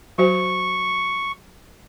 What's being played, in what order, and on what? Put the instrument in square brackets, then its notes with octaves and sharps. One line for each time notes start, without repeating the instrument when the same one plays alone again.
[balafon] F#3 F#4 C5 [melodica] C#6